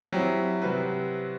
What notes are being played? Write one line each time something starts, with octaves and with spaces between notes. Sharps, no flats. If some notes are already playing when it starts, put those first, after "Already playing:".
F#3 G3 C4 E4
C3 G3 C4 F#4 B4